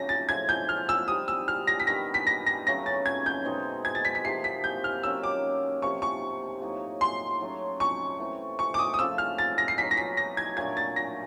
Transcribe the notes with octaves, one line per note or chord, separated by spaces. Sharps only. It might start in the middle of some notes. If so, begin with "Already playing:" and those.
Already playing: C#3 F#3 A3 A#6
A6
A2 F3 G#3 G#6
G6
F6
E6
G3 C4 D#4 D#6
E6
F6
A#6
B6
D#3 G3 B3 D4 A#6
B6
A#6
A#6
C#3 F#3 A3 C#4 A#6
A6
G#6
G6
B2 G#3 C4 D#4
G#6
A6
B6
B6
C3 F3 A#3 C7
B6
G6
F6
D#3 F#3 A#3 C#4 E6
D6
C3 F3 A#3 C#6
C#6
A2 F#3 A#3 D#4
C6
F#3 A3 C#4
C#6
E3 A3 C4
C#6
D6
D#6
D#6
C#3 F3 A3 E6
F6
A6
A#6
C7
F#3 B3 D#4 B6
A#6
B6
A#6
G#6
A#2 F#3 A3 D4 G#6
A6
A#6